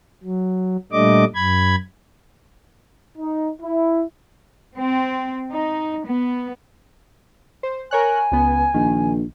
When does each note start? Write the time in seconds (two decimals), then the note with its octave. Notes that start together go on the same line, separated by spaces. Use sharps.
0.24 F#3
0.92 A#2 G3 A3 D4 D#5 D6
1.35 F#2 B5 G#6
3.17 D#4
3.62 E4
4.76 C4
5.51 D#4
6.05 B3
7.63 C5
7.91 A#4 C#5 G#5 F#6
8.32 C#2 B3
8.74 A#1 D#3